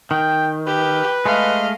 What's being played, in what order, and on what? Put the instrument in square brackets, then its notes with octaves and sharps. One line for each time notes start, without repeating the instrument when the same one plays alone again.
[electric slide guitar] D#3 [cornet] G5
[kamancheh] G4 [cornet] B4
[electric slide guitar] G#3 A3 [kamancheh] D#5 F5